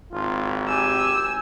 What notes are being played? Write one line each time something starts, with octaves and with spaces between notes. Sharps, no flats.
G#1 F4
G4 G#5 E6